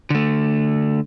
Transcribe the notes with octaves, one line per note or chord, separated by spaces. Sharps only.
D3 A3